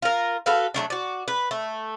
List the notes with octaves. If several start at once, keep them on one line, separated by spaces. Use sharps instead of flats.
F4 A#4
F#4 A4 B4 F5
F#3 G#3 A3 D4
F#4 D5
B4
A3